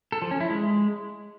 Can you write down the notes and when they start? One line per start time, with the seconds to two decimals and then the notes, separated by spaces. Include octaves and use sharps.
0.12 A4
0.22 F3
0.31 C#4
0.40 E4
0.50 G#3